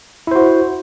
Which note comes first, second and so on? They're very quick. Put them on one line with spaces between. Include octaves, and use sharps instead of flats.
E4 C5 F#4